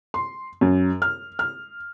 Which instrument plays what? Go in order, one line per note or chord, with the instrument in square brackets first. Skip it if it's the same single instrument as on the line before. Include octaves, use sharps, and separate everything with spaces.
[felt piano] C6
F#2
F6
F6